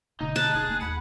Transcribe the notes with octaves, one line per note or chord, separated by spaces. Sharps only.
B2 D3 D#4
A5 F#6
C#4 G#4
A#3
D#2 F#5 B5